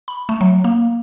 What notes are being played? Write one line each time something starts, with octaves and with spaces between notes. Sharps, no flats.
B5
A3
F#3
A#3